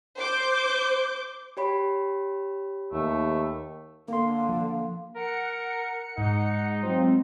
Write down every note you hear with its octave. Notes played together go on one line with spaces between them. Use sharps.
C5 D6 G6
G4 C#5 B5
D#2 A3
D3 A#3 F5 C6
F3
A#4 F#5 C#7
G#2 D#4
F#3 G#3 C4 F4